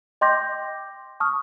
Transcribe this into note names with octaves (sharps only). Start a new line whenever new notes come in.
D#5 G5 C6 D6 G6 A#6
A5 C#6 D#6 F6